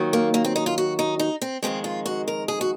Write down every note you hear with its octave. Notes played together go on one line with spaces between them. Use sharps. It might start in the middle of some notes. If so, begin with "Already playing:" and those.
Already playing: D#2 D#3 F#3
A#3
A#3
C4
D#4
F4
F#4
D#4
D#4
C4
F2 D#3 G#3 C4
F4
F#4
A#4
G#4
F#4